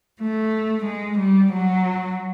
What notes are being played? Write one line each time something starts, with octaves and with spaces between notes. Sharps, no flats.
A3
G#3
G3
F#3